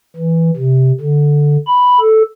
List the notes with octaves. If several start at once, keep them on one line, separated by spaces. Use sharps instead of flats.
E3
C3
D3
B5
A4